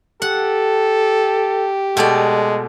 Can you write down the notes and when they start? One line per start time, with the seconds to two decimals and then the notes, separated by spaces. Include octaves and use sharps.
0.22 G4 A4 F#5
1.97 B2 G#3 A3 D5